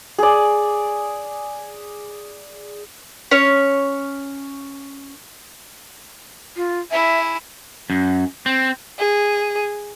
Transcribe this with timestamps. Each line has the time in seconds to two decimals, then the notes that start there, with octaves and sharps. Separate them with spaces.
0.18 G#4 D5
3.31 C#4 C#5
6.56 F4
6.91 E4 G#4 E5
7.90 F#2
8.46 C4
8.99 G#4